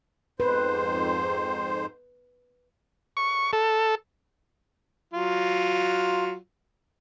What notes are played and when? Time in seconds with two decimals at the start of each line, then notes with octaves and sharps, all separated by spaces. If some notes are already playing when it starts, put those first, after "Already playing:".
0.40 F2 G#2 B4 C5
3.17 C#6
3.53 A4
5.13 F#3 F4